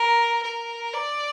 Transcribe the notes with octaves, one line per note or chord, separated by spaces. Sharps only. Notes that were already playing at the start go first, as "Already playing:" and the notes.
Already playing: A#4
A#4
D5